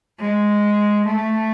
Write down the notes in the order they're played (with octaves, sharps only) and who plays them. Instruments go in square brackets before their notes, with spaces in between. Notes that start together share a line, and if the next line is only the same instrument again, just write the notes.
[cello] G#3
A3